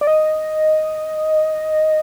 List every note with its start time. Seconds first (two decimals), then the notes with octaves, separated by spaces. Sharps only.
0.01 D5
0.07 D#5